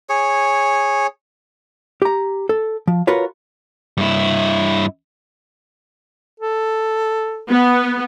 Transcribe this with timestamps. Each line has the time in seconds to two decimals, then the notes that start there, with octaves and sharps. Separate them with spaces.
0.09 G#4 C#5
2.02 G4 A#5
2.49 A4
2.88 F3
3.07 F4 F#4 A#4 B4 C#5
3.98 G2 E4
6.40 A4
7.50 B3